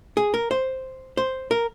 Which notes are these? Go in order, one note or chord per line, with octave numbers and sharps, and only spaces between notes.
G#4
A#4
C5
C5
A#4